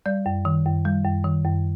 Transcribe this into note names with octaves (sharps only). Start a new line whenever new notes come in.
G3 D5
F#2
D#3
F#2
G3
F#2
D#3
F#2